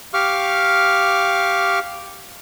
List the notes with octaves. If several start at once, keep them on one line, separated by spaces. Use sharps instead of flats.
G4 F5 C#6 D6 F6